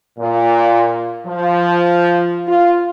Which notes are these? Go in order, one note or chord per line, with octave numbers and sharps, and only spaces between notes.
A#2
F3
F4